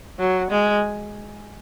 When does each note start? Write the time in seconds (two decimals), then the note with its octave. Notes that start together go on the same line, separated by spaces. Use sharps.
0.19 F#3
0.51 G#3